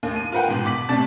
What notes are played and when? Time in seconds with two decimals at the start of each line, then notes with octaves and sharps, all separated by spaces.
0.03 D#2 A2
0.16 D#7
0.32 F4 A#4 B4 F#5 G5
0.48 G#2 B2
0.65 B2 D6 B6 F#7
0.89 A2 C3 D5 A5 A6